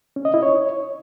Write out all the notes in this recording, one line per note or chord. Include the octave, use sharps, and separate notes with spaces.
C#4
D#5
E4
C#5